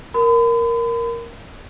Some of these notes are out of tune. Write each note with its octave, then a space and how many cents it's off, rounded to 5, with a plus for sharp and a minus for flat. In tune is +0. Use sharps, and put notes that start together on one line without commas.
A#4 +0 B5 +40